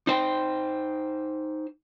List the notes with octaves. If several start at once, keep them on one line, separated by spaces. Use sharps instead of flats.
D#4 C5 G5